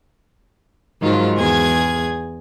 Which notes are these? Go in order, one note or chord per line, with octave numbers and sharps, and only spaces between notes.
G#2 D#3 F3 F#3 F4
E2 G#4 G#6